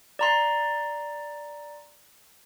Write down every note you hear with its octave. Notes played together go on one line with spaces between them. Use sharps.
D5 A#5 C6